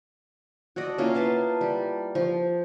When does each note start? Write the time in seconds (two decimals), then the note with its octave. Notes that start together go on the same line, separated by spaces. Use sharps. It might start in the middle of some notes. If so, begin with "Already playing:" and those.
0.76 F#4 A4 D5 D#5
0.98 A#3 C#4 E4 F4
1.15 A#3 B3 A5 C6
1.61 G3
2.15 F3